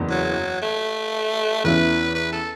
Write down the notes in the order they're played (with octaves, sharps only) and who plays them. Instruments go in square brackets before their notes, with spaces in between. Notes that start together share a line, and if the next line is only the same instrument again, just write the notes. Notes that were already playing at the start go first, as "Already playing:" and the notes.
Already playing: [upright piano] F#1 E2 E3
[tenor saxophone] F#3
A3
[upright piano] E2 E3 C#4 E4 [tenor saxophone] B4
[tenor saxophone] B4
A4